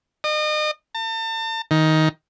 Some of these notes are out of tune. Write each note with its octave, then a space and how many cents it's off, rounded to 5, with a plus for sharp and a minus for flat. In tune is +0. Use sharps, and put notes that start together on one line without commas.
D#5 -35
A5 +40
D#3 +15